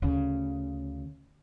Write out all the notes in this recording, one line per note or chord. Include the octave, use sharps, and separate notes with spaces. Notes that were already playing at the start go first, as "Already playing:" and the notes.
D2 C#3